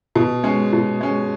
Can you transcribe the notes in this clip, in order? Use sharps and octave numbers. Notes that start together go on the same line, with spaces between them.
B2
G#3 C#4
B2
G#3 C#4